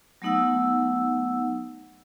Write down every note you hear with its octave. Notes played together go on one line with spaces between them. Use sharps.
F#3 A3 B3 D#4 F#5 E6